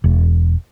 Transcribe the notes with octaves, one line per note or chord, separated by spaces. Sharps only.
E1